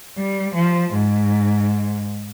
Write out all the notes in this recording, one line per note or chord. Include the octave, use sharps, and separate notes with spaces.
G3
F3
G#2